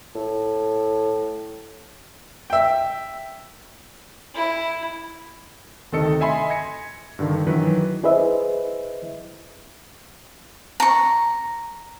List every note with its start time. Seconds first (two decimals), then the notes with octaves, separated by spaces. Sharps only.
0.15 A2
2.50 E5 G5
4.34 E4
5.92 D2 C3 D#3 A4 D#5 C#7
6.20 D#5 E5 G#5 B5 C6
6.50 G#6 A#6 C#7
7.19 G2 D3 D#3
7.47 D#3 E3 F#3 B4
8.04 E4 G#4 B4 C5 D#5 E5
10.80 A#5 C#6